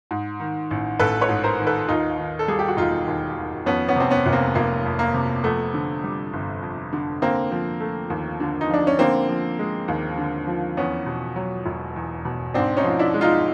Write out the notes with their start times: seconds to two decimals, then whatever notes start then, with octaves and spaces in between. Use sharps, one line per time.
0.11 G#2
0.40 D#3
0.71 A1
0.99 A1 A4 B4
1.21 B4 C#5
1.29 G#2
1.44 A#4 C5
1.60 D#3
1.67 A4 B4
1.88 D#2 D#4 F4
2.18 D#3
2.39 A4
2.48 G3 G#4
2.59 G4
2.68 F#4
2.77 E1 D#4 F4
3.07 D#2
3.36 D#3
3.66 F2 B3 C#4
3.88 B3 C#4
3.96 C3 C4
4.11 B3 C#4
4.26 F1
4.33 A#3 C4
4.55 F1 A#3
4.85 F2
4.99 A#3
5.14 C3
5.44 F2 A3 B3
5.74 D3
6.04 G3
6.33 G1
6.62 F2
6.93 D3
7.22 D3 A#3 C4
7.51 F3
7.80 A3
8.10 D#2
8.40 D3
8.61 D#4
8.69 F3 D4
8.87 C#4
8.99 D3 A#3 C4
9.29 F3
9.59 G#3
9.88 D#2
10.18 D3
10.47 F3
10.77 E2 B3 C#4
11.06 B2
11.36 F#3
11.66 E1
11.96 E2
12.25 B2
12.54 G#2 C4 D4
12.77 C#4 D#4
12.84 F3
12.99 D4 E4
13.14 G#3
13.21 D#4 F4